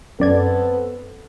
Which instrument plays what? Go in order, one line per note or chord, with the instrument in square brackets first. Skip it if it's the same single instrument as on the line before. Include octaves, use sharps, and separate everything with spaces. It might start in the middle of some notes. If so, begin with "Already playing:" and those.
[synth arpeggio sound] F#2 D5 G#6 [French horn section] B3 C4 A4